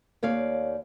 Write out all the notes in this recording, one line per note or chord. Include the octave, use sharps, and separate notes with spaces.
D#2 C#5 D5 F5